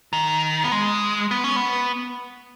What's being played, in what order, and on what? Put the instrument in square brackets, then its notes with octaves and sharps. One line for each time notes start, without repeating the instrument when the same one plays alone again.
[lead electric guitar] D#3
B3
G#3
B3
C#4
B3